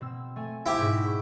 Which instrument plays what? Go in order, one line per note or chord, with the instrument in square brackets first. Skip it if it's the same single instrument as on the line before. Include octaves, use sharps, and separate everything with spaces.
[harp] B2 C4 E6
A3 G#5
[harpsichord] E4 G4 [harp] C5
[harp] G#2 B2 F#4
C#6